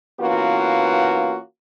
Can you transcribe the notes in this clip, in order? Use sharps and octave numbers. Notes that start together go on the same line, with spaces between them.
E3 A#3 B3 C#4 F4 F#4